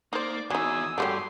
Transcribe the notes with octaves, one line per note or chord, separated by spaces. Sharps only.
A#3 D#4 C5 D5 D6
E2 F#3 D#4 G#5 D#6 E6
G2 F#3 G#3 A3 G4 C6